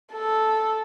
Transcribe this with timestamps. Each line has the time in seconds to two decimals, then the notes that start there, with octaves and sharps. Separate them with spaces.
0.13 A4